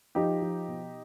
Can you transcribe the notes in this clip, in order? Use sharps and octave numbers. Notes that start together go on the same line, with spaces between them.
F3 D#4 G4
F3
B2